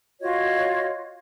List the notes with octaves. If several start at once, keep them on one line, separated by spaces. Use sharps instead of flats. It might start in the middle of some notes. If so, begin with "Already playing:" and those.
F4 F#4 C#5 D#5